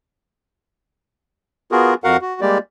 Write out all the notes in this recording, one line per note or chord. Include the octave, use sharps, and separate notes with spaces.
B3 F4 F#4 G#4 A#4
F2 F#4 A#4 F5 F#5
F#4
G3 G#3 A#3 G4 D5